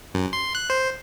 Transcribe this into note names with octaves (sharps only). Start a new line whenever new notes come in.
F#2
C6
F#6
C5